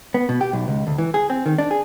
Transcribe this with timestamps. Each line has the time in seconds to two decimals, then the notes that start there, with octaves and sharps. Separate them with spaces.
0.14 B3
0.29 B2
0.41 G4
0.53 B1
0.68 C#2
0.87 D2
0.98 E3
1.14 G#4
1.30 C4
1.46 D#3
1.58 D4
1.71 G#4